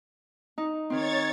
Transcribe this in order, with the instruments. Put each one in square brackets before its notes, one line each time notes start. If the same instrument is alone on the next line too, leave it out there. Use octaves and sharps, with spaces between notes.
[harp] D#4
[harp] D#3 C4 [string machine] C#5 G#6 A6